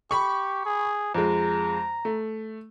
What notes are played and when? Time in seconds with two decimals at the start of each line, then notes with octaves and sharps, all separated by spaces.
0.11 G4 B5 C#6
0.65 G#4
1.15 F2 G#3 A#5
2.05 A3